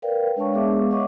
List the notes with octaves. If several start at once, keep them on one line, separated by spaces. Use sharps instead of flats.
A#4 B4 D5 F5 G5
G#3 D4 C#5 F5 A5 C#6
G#3 B3 G#4 E5 D6
C#5 D#5 F5 F#5 C#6 D6